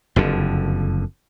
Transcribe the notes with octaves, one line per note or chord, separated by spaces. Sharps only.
F#1 F2 D3